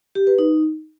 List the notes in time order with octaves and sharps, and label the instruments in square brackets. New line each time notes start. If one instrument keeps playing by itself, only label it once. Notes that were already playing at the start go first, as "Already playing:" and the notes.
[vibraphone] G4
B4
D#4